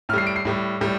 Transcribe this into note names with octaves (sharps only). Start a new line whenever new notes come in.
A2 G3 F6 C7
D7
C7
A2 G3
A2 G3